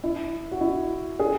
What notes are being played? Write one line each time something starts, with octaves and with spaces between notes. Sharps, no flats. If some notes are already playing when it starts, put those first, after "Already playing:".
E4
F#4
E4
G#4